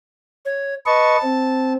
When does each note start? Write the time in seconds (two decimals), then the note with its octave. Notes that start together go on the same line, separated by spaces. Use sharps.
0.45 C#5
0.86 B4 D#5 A5 C#6
1.22 C4